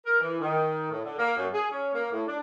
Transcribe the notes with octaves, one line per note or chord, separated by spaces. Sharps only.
A#4
E3
D#3
A2
D3
A#3
F#2
G#4
C#4
A#3
A2
D4